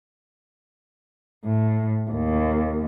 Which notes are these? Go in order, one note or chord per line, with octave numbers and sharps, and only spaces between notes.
A2
D#2